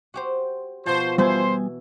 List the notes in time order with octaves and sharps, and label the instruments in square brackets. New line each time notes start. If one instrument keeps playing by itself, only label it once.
[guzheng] F#4 G4 C5
[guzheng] B2 F#4 A5 [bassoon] F3 [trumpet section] C5
[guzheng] E3 E4 [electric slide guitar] G3 B3 G#5 [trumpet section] C5